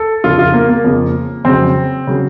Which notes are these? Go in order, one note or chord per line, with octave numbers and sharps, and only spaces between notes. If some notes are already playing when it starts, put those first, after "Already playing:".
Already playing: A4
F2 C#3 F3 F4
F4
A#3
A#3
F2 C#3 F3
F2 C#3 F#3 C4
C#3 F#3